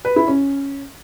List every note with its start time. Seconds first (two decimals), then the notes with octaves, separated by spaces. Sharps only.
0.05 B4
0.16 E4
0.28 C#4